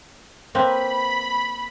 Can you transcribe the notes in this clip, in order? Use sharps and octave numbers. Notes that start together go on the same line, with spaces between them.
A#3 C4 B4 B5